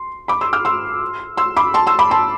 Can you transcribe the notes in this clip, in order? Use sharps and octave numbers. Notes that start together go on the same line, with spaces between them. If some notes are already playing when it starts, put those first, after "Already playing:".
Already playing: C6
B5 D6
C6 E6
D6 F6
C6 E6
C6 E6
B5 D6
A5 C6
C6 E6
B5 D6
A5 C6